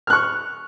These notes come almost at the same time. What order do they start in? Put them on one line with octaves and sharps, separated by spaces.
F6 F#6 C#6